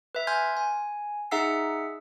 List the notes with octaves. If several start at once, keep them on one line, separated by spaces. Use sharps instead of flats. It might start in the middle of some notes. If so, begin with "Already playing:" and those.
B4 E5
G#5 C6 F6 G6 G#6
G#5
D#4 G#4 E5 F#5 E6 C7